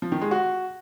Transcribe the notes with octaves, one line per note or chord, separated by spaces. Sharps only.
F3
D#3
G#3
F#4